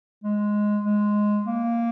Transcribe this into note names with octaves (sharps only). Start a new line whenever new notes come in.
G#3
G#3
A#3